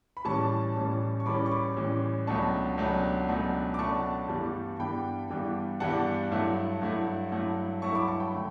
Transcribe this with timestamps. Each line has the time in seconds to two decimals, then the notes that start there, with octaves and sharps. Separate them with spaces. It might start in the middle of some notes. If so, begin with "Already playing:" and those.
0.17 B5
0.25 A1 A2 E3 G3 C#4 A5 C#6
0.76 A1 A2 E3 G3 C#4
1.20 C#6
1.26 A1 A2 E3 G3 C#4 B5 D6
1.46 C#6
1.52 B5 D6
1.77 A1 A2 E3 G3 C#4
2.27 C#2 B2 F#3 A3 D4 A5 C#6
2.78 C#2 B2 F#3 A3 D4
3.28 C#2 B2 F#3 A3 D4
3.74 D6
3.79 C#2 B2 F#3 A3 D4 A5 C#6
4.28 G2 E3 G3 B3 D4
4.80 G2 E3 G3 B3 D4 G5 B5
5.30 G2 E3 G3 B3 D4
5.80 G2 E3 G3 B3 D4 F#5 A5
6.31 G2 F#3 A3 E4
6.82 G2 F#3 A3 E4
7.32 G2 F#3 A3 E4
7.82 G2 F#3 A3 E4 A5 C#6
7.95 B5 D6
8.08 A5 C#6
8.20 G5 B5
8.34 D3 A3